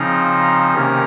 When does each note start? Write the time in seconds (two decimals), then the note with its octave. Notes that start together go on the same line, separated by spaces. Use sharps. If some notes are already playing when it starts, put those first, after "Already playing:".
Already playing: C#3 F3 C4 D#4 A#5
0.75 C3 D#3 A#3 C#4